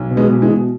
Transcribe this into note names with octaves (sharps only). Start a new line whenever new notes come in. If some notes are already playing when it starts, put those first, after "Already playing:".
Already playing: B1
B2
G#3 B3
B2
E3 G#3
B2